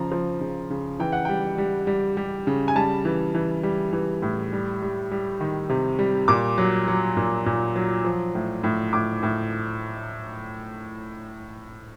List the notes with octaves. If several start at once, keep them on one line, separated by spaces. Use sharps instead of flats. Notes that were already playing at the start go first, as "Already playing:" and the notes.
Already playing: C#3 F3 A#5
F3
C#3
C#3
E3 G5
F#5
G3 G5
G3
G3
G3
C#3
G#5
G3 A5
E3
E3
G3
E3
A2
G3
G3
G3
D#3
C3
G3
A#2 D6
F#3
F#3
A#2
A#2
F#3
F3
A2
A2
A2 D6
A2